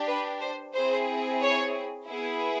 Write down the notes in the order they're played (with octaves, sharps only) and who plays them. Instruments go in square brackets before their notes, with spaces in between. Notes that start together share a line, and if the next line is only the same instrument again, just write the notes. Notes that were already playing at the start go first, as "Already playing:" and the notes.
Already playing: [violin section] D4 G4
B4
C5
C4 E4 G#4 C5
C#5
B3 E4 G#4